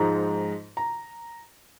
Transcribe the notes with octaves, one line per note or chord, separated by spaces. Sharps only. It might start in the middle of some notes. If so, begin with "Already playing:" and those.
Already playing: G#2 F3 G#3 A#5
A#5